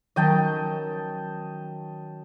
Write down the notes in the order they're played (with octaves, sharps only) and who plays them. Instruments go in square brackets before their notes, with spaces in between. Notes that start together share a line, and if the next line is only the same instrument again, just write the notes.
[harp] D#3 F#3 C#4 [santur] D#5 G5 A5